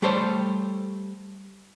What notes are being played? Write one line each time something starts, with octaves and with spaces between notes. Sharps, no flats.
G3 A3 G4 A4 C5 C#5